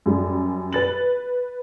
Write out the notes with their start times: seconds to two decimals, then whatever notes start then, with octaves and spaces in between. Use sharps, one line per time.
0.06 F#2 G3
0.73 B4 A6 F#7